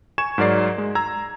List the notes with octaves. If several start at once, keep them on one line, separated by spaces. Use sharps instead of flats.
G#5 C#6 G#6 E7
G#2 F#3 A#4 D5 C7
G#3
A#5 E6 G#6